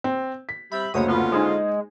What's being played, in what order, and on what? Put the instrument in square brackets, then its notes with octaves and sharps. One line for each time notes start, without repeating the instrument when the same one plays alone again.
[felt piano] C4
B6
[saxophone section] G3 C4 E5 [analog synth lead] B5
[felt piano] F#1 D2 C5 [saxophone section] D3 G#3 C#5 [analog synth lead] D#6
[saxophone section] D3 C#4 F4 [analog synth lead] B3
[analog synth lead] G#3 [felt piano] D#4 G#4 C5